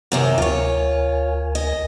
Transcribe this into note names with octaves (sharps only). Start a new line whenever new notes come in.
F#2 C3 D#3 F#5
D2 F4 A#4 C#5 G#5
D#5